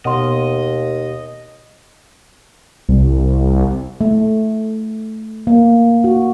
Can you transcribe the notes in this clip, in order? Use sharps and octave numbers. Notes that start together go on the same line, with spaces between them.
D#2 B2 D#5 F#5 C6
C2
A3
A#3
F#4